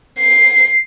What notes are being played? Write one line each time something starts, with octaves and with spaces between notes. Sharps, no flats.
C7